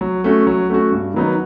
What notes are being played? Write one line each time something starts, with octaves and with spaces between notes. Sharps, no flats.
F#3
A3 C#4 F#4
F#3
A3 C#4 F#4
G2
D#3 F#3 B3 D#4